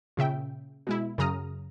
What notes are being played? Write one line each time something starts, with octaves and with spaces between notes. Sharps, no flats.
A#2 C#3 E5 G5
B2 G#3 E4
F#2 C#3 A#5 D#6 F6